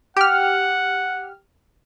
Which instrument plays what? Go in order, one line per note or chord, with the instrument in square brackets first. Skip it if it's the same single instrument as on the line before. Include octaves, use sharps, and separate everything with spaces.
[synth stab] G4 F6 [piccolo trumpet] F#5